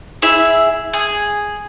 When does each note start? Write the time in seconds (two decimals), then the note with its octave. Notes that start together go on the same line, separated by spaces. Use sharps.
0.22 E4 G#4 E5
0.93 G#4